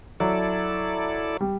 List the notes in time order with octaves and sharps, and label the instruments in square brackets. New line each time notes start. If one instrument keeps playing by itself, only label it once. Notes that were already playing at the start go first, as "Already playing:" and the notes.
[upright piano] F#3 [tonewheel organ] E4 A4 D5
[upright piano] G3